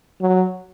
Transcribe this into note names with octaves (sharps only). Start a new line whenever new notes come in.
F#3